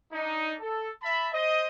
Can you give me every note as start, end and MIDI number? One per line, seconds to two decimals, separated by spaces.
0.13 0.55 62
0.13 0.55 63
0.61 0.90 69
1.02 1.29 76
1.02 1.29 81
1.02 1.29 83
1.33 1.67 72
1.33 1.67 75